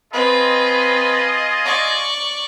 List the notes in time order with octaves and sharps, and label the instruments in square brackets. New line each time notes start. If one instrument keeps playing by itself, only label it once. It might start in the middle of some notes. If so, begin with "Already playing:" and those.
[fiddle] C4 B4 [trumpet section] F4 G#4 D#5
[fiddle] D5 C#6